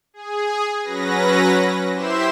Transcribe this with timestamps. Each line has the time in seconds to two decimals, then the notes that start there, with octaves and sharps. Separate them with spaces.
0.14 G#4
0.82 F#3 C#4 B4 A#6
1.94 E4 G4 C5 E5 C6 E7